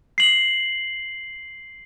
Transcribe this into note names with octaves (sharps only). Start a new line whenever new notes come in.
C7 F#7